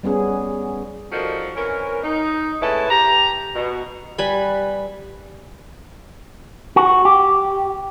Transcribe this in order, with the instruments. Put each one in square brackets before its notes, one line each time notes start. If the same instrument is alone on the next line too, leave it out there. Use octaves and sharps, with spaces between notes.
[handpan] G3 B3 C#4 G#4
[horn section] F3 G3 D#4 F#4 A4 A#4
E3 C4 C#4 A#4
D#4
G#3 A3 C#4 E4 B4 A5
G4 A#5
B2
[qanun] G3 B4 G#5 B5
[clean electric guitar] F#4
G4